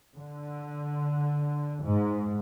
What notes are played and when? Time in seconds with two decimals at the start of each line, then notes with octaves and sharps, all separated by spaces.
0.15 D3
1.83 G#2